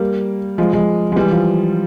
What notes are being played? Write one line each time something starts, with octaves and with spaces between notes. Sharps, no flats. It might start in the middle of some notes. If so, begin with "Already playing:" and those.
Already playing: G3 A#3
F3 G#3
F3 G#3
G#3
E3 G3
F3